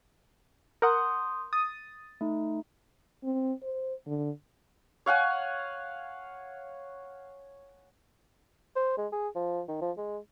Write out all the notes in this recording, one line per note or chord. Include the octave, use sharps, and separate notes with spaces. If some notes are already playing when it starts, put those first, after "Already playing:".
A#4 F#5 C6 D#6 G6
D#6 A6
A3 D#4
C4
C5
D3
C#5 F5 F#5 G#5
C5
G#3
G#4
F3
D#3
F3
G#3